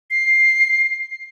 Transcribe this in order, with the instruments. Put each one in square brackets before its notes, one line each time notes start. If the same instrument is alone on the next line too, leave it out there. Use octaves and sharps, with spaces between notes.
[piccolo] C7